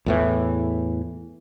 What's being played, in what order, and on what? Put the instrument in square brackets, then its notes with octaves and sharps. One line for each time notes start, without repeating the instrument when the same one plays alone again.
[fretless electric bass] E2 A2 E3